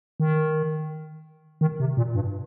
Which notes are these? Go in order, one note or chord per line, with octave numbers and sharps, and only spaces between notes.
D#3
D#3
C3
A#2
G2